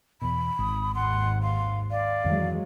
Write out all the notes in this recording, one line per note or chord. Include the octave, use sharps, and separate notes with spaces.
E2 B2 B5
G#1 D#6
D#2 G#2 F#5 C6
F5 C6
D5 F5
F2 D#3 E3 F#3 G#3